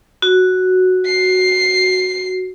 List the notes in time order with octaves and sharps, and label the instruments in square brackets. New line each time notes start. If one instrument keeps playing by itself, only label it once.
[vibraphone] F#4
[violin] C7